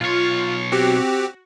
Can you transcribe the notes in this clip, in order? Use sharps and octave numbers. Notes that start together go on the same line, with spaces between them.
B1 F4 C#5
C4 F#4 G4